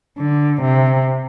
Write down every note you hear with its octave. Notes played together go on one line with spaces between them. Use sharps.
D3
C3